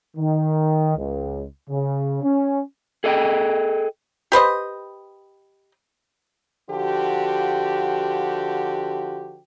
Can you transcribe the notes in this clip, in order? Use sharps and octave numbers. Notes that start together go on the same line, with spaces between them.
D#3
C#2
C#3
C#4
G#4 A4 D#5 F#5 G5
G4 B4 C5 D#5
D3 F3 F#4 G4